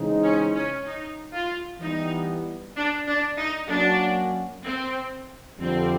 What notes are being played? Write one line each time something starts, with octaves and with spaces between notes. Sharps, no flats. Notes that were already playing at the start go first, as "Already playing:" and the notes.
Already playing: C#3 E3 G#3 C4 D#4
C#4
C#4
D#4
F4
E3 G3 B3 D#4
D4
D4
D#4
F#3 A#3 C#4 D4 F#4
C4
F2 D3 G3 C4